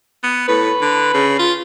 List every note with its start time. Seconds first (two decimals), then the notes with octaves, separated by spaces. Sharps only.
0.23 B3
0.48 A2 B4
0.81 D3
1.14 C#3
1.39 F4